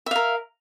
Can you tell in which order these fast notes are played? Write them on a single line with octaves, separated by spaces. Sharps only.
E5 F5 A#4